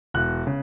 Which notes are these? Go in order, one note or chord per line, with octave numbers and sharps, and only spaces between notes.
E1 F#6
C#3